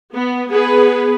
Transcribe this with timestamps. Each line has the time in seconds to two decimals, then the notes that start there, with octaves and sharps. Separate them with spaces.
0.14 B3
0.50 B3 G#4 B4